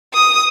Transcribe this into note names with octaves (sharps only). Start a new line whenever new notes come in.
D#6